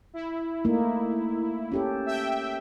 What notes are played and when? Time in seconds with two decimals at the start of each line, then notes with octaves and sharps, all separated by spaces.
0.13 E4
0.65 A3 A#3 D#4
1.72 C#4 G4 A4
2.06 E5 G5